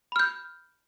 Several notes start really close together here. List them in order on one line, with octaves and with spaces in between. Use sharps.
B5 F6 G6